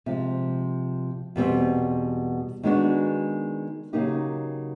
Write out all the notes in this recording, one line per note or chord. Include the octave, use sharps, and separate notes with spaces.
C3 F3 G#3
E2 B2 G3 C4
D#3 G#3 B3 D4 F#4
C#3 F#3 A#3 D#4 G4